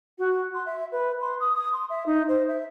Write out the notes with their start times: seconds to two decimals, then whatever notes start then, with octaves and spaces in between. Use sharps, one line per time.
0.18 F#4
0.54 C6
0.66 E5
0.92 B4
1.21 C6
1.40 D#6
1.54 D#6
1.72 C6
1.89 E5
2.06 D#4
2.28 C5
2.48 E5